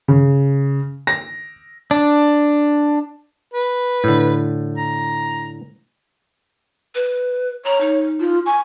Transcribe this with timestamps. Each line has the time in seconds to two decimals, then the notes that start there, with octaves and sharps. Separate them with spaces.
0.08 C#3
1.07 A#6
1.91 D4
3.54 B4
4.04 A2 D3
4.77 A#5
6.95 B4
7.65 C#5 A#5
7.80 D#4
8.20 F4
8.46 G#5 C#6